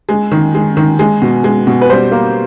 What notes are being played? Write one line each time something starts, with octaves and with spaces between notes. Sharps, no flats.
G#3
D#3
G#3
D#3
G#3
B2
G#3
B2
B4
G3 C5
A#3